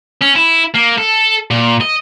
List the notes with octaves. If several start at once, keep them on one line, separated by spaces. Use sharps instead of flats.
C#4
E4
A#3
A4
A#2
D#5